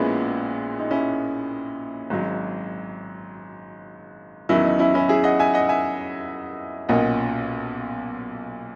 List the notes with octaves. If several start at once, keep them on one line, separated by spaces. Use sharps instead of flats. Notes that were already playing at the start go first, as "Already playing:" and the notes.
Already playing: A#1 A#2 G#3 B3 C#4 E4
D#4
C#4 E4
G#1 G#2 F#3
E2 D#3 F#3 C#4 E4
D#4
C#4 E4
C#4 E4
E4 G#4
D#5 F#5
E5 G#5
D#5 F#5
E5 G#5
B1 A#2 A#3 C#4 D#5 F#5